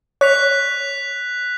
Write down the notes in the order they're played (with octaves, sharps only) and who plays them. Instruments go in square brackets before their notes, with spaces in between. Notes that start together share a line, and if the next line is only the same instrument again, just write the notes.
[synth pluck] C#5 [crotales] F#6 B6 F7